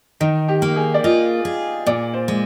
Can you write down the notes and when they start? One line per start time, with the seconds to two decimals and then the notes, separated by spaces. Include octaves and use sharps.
0.20 D#3 D#4
0.48 G4
0.62 A#3
0.76 G#4
0.94 D5
1.04 F4 D#5
1.45 G#4
1.86 A#2 D5
2.14 C5
2.28 G#3